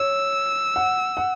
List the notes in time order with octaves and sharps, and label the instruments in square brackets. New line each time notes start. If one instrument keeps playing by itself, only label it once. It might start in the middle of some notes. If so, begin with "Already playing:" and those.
Already playing: [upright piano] C#5 [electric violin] E6
[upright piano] F#5
F#5